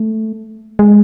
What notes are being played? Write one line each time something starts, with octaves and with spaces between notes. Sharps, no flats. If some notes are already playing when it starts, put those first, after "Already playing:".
Already playing: A3
G#3